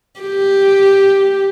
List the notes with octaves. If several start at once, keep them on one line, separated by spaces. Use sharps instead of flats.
G4